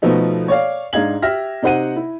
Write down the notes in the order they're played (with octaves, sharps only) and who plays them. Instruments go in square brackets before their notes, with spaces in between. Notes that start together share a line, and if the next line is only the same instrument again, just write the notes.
[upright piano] B2 F3 A3 B3 D#4 A4
C#5 D5 F5
G#2 D4 D#4 F5 G#6 F#7
G4 E5 F6 A#6
C3 D#4 C5 F#5 D#7
E4